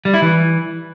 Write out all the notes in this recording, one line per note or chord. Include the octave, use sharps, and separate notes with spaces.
G3
E4
E3